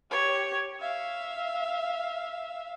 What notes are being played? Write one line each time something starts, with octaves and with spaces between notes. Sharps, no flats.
G4 C#5
E5 F5